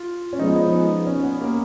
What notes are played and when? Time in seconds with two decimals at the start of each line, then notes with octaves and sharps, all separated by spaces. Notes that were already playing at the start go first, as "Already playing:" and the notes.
Already playing: F4
0.33 C#4
0.39 F3 G#3 B3 D#4
0.56 D#4
1.07 C#4
1.24 B3
1.41 A#3